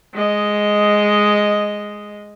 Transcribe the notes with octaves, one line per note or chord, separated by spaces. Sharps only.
G#3 D#5